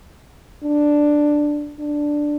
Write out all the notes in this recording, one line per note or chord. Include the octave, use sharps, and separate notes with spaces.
D4
D4